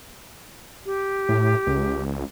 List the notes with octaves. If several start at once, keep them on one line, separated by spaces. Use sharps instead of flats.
G4
A2
C#2